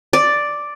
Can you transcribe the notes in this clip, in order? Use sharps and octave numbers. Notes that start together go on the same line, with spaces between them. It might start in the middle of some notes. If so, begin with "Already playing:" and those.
D5